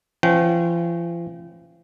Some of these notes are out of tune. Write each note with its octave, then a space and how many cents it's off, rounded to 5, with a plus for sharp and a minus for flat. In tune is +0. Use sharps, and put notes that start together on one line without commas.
F3 -45 C#4 -30 G5 -35